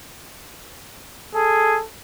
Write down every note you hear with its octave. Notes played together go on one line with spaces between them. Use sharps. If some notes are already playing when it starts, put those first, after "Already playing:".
G#4 A4